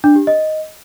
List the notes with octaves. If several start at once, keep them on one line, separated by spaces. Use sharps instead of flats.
D4
G4
D#5